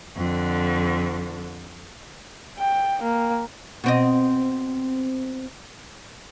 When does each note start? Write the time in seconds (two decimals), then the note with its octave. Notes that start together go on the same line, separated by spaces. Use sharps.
0.16 F2 D3
2.59 G5
3.02 A#3
3.84 B2 C4 D#5